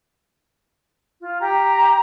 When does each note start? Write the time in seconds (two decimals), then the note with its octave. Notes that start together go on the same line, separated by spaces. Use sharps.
1.21 F4
1.40 G4 G5 A#5